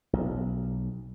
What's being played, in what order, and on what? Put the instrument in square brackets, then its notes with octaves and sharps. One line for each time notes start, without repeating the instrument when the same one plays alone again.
[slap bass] B1